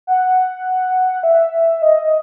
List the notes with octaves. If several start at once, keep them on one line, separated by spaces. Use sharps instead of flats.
F#5
E5
D#5